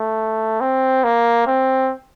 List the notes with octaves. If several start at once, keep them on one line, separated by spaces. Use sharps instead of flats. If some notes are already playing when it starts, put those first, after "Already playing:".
Already playing: A3
C4
A#3
C4